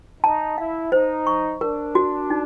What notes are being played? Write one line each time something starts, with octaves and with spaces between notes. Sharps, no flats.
D#4 A5
E4 F5
D#4 C5
C#6
D4 A#4
F#4
D#4